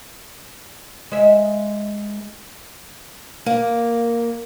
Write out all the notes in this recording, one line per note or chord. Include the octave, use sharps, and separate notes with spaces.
G#3 E5
A#3